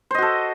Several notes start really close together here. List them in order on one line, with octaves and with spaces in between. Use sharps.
C5 D#5 F#4 A4